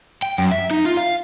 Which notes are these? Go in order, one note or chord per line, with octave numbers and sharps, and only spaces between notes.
G5
F#2
E5
D#4
F4
F5